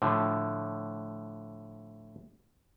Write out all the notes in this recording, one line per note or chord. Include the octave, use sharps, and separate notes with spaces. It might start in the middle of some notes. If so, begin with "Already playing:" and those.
A2 D3 F3